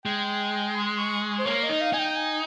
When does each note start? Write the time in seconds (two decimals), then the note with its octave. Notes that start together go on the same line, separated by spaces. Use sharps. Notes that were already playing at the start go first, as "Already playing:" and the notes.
0.05 G#3 G5
0.75 C6
0.99 C#6
1.39 C5
1.46 A#3 C#5
1.63 D#5
1.69 D#4
1.81 F5
1.93 D#4 G#5
1.99 G5
2.16 G#5